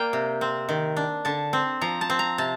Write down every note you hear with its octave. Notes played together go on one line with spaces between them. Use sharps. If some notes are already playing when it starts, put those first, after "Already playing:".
Already playing: A#3 D5 F5 G5
C3
C4
D#3
D4
D3 A5
C4
F3 A#5
A5
C4
A#5
C3 A5